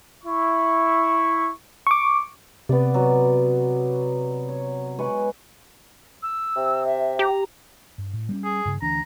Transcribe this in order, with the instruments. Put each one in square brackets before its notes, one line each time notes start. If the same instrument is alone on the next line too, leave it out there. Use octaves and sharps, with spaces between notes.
[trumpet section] E4 C#6
[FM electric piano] C#6 D6
[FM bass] C3 [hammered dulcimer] B3 D5
[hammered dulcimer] F#3
C#5
G#3 B4 C#6
[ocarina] E6
[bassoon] C3
[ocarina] E5
[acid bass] G4 [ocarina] A#5
[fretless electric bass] G2
A2
G3 A#3 C#4
[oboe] G#4
[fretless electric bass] G2 C#3
[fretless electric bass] D2 E3 D4 [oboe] A#5